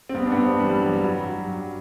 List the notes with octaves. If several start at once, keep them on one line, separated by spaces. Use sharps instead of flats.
C4
G2 B3
D4
B3
G2 C4
D4
E3 G3
G3
E3 F#3
G3
G2 F#3
G2
F#3